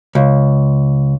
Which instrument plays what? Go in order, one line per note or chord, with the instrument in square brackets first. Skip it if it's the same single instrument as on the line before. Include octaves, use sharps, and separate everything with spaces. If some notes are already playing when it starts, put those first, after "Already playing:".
[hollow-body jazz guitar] C#2